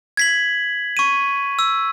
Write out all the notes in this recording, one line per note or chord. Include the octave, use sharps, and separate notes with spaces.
G#6 B6 F#7
C#6 D#7
E6